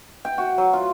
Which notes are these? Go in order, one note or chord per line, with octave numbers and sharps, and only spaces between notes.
G5
F#4
F#3
F4